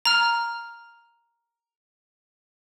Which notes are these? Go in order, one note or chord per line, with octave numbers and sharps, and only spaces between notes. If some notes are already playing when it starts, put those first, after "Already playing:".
A#5 F6